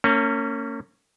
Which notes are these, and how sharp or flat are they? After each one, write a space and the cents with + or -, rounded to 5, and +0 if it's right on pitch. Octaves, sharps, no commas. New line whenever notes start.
A#3 -35 C#4 +0